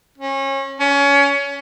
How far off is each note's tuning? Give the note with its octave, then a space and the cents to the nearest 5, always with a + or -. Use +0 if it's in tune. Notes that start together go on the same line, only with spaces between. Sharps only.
C#4 -30
C#4 +25